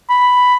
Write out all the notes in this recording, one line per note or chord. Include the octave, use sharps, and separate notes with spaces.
B5